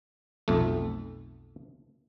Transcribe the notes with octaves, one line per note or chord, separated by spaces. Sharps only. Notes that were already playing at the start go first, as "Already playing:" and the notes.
B1 F2 A3